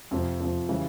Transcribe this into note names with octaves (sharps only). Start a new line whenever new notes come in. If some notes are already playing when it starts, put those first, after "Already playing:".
F2 C3 F3
F2 C3 F3
C#3 E3 G3